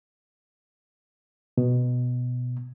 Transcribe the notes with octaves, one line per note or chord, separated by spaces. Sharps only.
B2